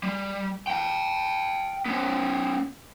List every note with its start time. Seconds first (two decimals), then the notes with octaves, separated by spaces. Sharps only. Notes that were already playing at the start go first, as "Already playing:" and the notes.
0.03 G3
0.67 F5 G5
1.86 B3 C#4